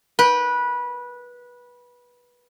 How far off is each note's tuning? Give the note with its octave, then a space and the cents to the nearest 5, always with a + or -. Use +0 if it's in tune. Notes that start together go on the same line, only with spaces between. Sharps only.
B4 -20 G5 -5